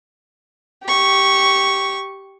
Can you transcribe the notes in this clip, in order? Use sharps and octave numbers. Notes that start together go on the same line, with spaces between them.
G4 C#6